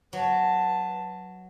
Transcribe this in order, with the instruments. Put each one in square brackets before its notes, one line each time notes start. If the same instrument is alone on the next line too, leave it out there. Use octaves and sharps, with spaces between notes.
[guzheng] F#3 [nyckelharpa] B4 A5